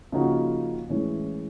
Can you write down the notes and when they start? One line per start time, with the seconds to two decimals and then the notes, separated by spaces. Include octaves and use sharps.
0.12 C#3 F3 A#3 D#4 F#4
0.89 A2 E3 G#3 C#4